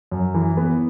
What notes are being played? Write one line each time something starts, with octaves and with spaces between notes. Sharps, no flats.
F#2
E3
B3